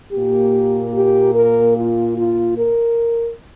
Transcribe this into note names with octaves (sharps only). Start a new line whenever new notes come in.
A#2 A#3 G4
G4
A#4
F4
F4
A#4